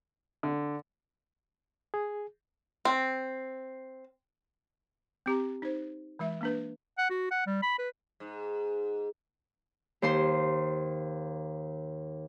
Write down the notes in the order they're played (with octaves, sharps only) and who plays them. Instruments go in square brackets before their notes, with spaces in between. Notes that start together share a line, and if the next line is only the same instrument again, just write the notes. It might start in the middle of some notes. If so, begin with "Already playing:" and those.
[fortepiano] D3
[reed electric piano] G#4
[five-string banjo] C4
[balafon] C4 G4 A#5
D#4 C5
E3 G#3 E5
A#3 D4 B4
[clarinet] F#5
F#4
F#5
G3
B5
B4
[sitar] G#2
[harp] D#2 C5 C6